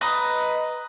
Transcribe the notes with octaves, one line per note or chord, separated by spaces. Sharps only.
B4 D#5 A#5